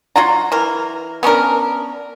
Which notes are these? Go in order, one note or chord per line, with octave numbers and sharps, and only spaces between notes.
F#3 F4 F#5 A#5
E3 A#4
B3 C#4 D4 A#4